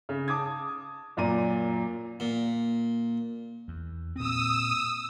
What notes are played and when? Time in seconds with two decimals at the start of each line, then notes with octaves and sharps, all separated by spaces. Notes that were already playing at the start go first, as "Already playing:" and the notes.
0.09 C#3
0.28 A5 D6 D#6 G#6
1.17 F#2 A#2 D5 A#5 D#7
2.20 A#2
3.68 E2
4.16 A#2 C4 D#6 E6